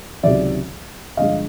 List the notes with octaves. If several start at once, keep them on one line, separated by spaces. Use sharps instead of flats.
C#2 C3 D#3 F#3 D5 E5
G2 D3 F3 G#3 D#5 F5